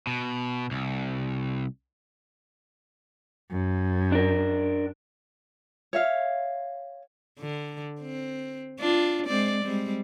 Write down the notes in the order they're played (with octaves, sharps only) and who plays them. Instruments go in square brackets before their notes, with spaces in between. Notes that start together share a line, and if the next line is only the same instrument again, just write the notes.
[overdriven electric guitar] B2
C2
[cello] F#2
[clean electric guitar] D4 A#4
[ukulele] C#5 E5 F5
[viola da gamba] D3
C4
D4 F4
G#3 C4 D5
G3 G#3 C4